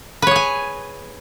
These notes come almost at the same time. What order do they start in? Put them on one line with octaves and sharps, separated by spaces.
B4 C#5 G#4 G#5